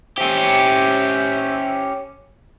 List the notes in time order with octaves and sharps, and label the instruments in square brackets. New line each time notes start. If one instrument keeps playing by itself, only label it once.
[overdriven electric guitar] C#4 G4 [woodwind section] C5 E5